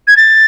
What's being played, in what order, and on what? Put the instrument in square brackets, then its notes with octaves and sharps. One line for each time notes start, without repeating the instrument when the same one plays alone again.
[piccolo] G#6
A6